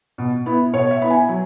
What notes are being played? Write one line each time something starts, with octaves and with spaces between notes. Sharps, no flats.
B2
B3 E4
B2 C#5
E5
B3 E4 B5
G#5
F#3